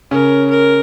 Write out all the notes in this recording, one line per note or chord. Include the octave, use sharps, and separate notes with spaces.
C#3 C#4 A#4
A#4